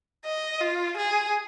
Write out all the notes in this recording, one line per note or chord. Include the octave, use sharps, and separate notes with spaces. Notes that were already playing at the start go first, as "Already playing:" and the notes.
D#5
F4
G#4